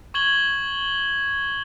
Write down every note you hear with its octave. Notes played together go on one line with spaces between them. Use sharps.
C#6 G#6 F#7 G7